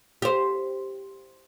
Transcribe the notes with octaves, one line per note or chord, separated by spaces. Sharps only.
G4 C5